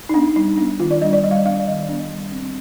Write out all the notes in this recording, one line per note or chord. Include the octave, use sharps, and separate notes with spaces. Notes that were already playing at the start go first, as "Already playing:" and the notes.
D#4
B3 D4
G3 D#4
B3 D4
D#3 F4
D5
G3 D4 D#5
D5
G3 D#5
F5
D#5
B3 D4 F5
D5
D#3 D#5
B3 D4
G3
C4